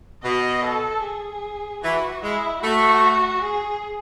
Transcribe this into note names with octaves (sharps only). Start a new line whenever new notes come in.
B2 D#5
A4
G#4
E3 F#4
G#3 E4
A3 F#4
G#4